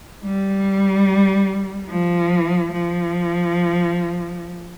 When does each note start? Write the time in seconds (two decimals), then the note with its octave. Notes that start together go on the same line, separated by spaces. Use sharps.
0.24 G3
1.90 F3
2.73 F3